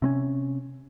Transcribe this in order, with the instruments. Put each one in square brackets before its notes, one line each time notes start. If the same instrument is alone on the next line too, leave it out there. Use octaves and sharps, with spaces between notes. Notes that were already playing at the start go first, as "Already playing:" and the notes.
[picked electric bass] C3 C4 C#4